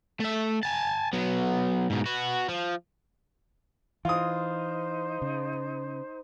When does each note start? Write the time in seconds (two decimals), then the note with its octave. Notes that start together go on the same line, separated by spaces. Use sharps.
0.20 A3 E5
0.63 G#5 A5
1.13 F#3 B3
1.90 G#2 B2
2.06 B3 F#4
2.49 F3
4.05 E3 D#4 F4 C5 D#6
5.22 C#3